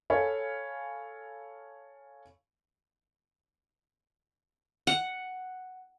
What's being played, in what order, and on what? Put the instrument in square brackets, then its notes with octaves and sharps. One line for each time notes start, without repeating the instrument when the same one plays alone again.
[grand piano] A4 C#5 F5 G#5 B5
[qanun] F#5